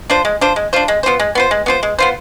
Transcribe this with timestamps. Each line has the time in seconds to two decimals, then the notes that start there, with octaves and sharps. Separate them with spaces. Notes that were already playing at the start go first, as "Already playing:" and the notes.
0.10 D4 F4 C5
0.25 G#3
0.41 D4 F4 C5
0.56 G#3
0.73 D4 F4 C5
0.88 G#3
1.03 B3 F4 C5
1.20 G#3
1.35 B3 F4 C5
1.51 G#3
1.66 B3 F4 C5
1.83 G#3
1.99 B3 F4 C5